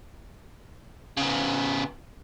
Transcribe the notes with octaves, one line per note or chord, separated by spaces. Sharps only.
C#3 B3